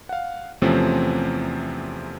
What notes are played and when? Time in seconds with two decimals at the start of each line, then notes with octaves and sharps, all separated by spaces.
0.09 F5 F#5
0.62 E2 C3 F3 A3 C4 C#4